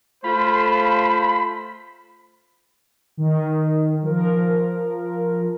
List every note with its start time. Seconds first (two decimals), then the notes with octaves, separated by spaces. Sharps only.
0.24 A3 F4 C5 B5
3.17 D#3
4.02 F3 A#4